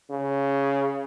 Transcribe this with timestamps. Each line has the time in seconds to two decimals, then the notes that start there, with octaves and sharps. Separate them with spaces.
0.10 C#3